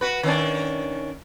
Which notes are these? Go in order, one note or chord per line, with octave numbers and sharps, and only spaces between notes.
F#4 B4
D#3 C#4 D4